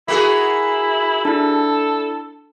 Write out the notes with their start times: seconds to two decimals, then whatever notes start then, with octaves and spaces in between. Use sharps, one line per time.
0.08 A#3 E4 F#4 G#4 B6
1.25 D4 E4 A4